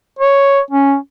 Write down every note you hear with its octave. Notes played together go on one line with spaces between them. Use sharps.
C#5
C#4